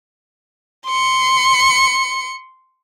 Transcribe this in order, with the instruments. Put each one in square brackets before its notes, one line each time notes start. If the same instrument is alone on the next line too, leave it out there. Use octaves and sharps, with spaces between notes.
[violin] C6 C#7